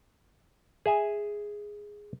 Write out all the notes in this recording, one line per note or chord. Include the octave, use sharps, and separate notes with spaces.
G#4 E5 G#5